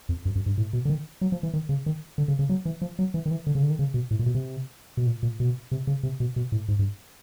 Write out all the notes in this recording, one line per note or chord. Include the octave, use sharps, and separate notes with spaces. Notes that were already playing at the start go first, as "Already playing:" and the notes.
F2
F#2
F#2
G2
A2
B2
D3
D#3
F#3
F3
E3
D#3
C#3
D#3
D3
C#3
C#3
F#3
E3
F3
F#3
E3
D#3
E3
D3
C#3
D3
D#3
C#3
B2
A2
A#2
B2
C3
B2
A#2
A#2
B2
C3
C#3
C3
B2
B2
A2
G#2
G2